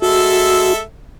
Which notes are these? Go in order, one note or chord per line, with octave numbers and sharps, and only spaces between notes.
G#3 F#4 A4 E5